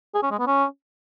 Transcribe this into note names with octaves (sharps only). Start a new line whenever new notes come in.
G#4
C#4
G#3
B3
C#4